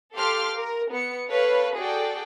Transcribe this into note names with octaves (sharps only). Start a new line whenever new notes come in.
G4 A4 F5 C6 D6 F6
A#4
B3 C#7
A4 B4 C#5 F5
F#4 G#4 A4 D5 G5